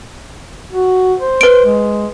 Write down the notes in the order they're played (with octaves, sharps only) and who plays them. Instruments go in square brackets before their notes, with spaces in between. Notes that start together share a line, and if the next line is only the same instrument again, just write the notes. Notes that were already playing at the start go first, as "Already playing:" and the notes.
[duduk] F#4
C5
[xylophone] B4 D7
[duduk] G#3